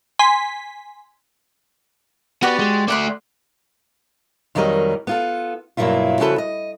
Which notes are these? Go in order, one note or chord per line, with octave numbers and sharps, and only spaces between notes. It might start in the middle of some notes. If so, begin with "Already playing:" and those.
G#5 C6 B6
B3 F#4 G4 D5
G#3
A3 D5 E5 F#5 C6
F2 D#3 F#3 G3 A#4 D#5
B3 F4 A4
G2 B2 F#3 A#3 E4 F4
C#3 F3 F#4 A4 B4
D#5